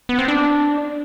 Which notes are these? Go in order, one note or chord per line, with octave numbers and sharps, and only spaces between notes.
B3
C4
D4